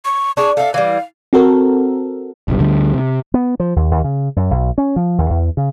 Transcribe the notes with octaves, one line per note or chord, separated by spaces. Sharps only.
C#6
D4 G#4 C#6
A4 E5 F5
E3 G3 F5
C4 F#4 A4 A#4
F#1 B1 G2
D2 D3 G3
C3
B3
F3
D#2
D#2
C#3
F#2
B1
C#4
F3
D#2
E2
C#3